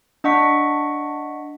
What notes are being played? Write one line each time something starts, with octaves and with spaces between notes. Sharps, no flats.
D4 D#5 F#5 C#6 B6